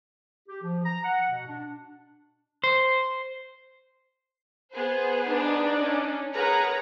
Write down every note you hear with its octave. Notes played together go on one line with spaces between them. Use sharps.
G4
F3
A#5
F#5
B2
D4
C5
B3 G#4 C5
D4 D#4
C#4
G#4 A#4 B4 C#5 F#5 A#5